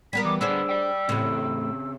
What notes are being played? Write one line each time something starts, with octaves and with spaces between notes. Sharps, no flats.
G3 B3 A#4 B6
E3 D6
D3 B3 D4 G#4 C5 E6
D5 G5
E2 A2 C#3 C4